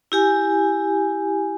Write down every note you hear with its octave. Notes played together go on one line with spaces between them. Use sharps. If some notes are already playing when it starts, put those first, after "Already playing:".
E4 G4 G#5